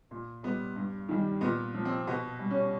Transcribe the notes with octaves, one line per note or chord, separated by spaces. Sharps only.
A#2
G3 B3
G2
D#3 G3
A#2 B3
F3
C4
B2 B3
G3
C#4